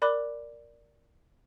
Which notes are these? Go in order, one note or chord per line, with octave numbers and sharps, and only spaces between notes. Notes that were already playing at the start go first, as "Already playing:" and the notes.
A#4 D5 B5 D6 F#6